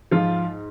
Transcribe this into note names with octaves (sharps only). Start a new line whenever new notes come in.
G#2 F3 F4